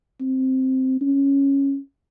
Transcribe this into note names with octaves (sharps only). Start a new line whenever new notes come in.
C4
C#4